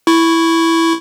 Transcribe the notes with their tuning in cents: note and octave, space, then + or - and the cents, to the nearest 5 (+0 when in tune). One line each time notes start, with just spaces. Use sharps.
E4 +0 C#6 +0